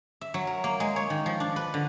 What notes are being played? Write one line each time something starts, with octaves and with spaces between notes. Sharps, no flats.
E5
F#3
A#4
A#3
G#3
C#5
D#3
F3
D4
B4
D3